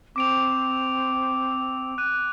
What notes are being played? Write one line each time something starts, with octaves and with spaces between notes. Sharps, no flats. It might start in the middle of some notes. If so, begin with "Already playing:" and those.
C4 D6 D7 F7
F#6 D#7